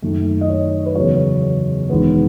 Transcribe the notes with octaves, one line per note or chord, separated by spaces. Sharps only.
F#2 D#3 A3
D#5
C#5
B4
E2 C#3 F#3 C#5
E1 E2 D#3 G#3 B3